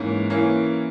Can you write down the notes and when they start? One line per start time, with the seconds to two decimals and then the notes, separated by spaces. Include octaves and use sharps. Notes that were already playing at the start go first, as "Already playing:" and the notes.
Already playing: G#2 E3 A#3 C#4
0.30 E3 A#3 C#4